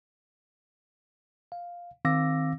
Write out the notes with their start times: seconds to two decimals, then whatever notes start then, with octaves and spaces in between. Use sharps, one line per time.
1.52 F5
2.05 D#3 C4 F5 D6 E6 A#6